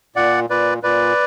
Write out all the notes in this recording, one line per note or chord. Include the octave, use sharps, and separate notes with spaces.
A#2 D5 F#5
A#2 B4 D5
A#2 B4 D5